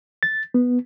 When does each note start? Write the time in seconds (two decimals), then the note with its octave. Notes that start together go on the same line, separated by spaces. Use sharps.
0.23 A6
0.54 B3